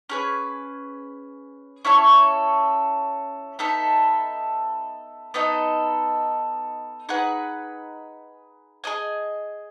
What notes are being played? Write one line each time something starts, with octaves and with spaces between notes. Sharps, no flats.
C#4 G#4 B4
C#4 E4 A4 C#5
B3 D#4 A4 E5
B3 D#4 A4 D#5
D#4 G#4 B4 F#5
G#4 D#5 G#5